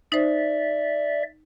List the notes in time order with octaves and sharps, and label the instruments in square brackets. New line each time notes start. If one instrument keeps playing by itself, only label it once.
[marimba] D#4 C5 [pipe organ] D5 E5